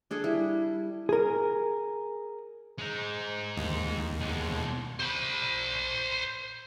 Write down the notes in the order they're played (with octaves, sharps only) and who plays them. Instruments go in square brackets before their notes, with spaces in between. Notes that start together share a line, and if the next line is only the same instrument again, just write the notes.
[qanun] D4 G#4 A4
G3 E4
[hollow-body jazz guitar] G#4 A#4
[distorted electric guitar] G#3 D#4
[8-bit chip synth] D#2
[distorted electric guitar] B2 G#3
C5 B5